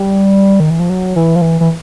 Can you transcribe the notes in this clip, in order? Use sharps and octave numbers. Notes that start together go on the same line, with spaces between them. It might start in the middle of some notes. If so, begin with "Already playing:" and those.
Already playing: G3
D#3
E3
F3
F#3
E3
F3
E3
E3